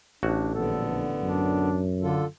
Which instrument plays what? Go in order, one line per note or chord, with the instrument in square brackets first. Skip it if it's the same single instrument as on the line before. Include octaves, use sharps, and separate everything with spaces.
[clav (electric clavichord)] A1 F#4 [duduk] D4
[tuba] A#1 [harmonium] D3 B3 [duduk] A4
[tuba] F#2 [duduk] D4
[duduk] D3 [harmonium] F4 A4